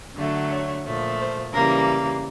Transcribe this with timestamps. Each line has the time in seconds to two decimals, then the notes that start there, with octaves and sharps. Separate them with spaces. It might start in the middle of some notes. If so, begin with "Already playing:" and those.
0.16 D3 F#3 A3
0.50 C#5
0.85 A#2 F3 A3
1.19 C5
1.53 C#3 E3 G3 A#3 A#4